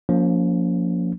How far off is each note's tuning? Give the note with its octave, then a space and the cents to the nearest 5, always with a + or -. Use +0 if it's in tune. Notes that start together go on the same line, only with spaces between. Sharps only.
F3 +30 A#3 +0 C#4 +45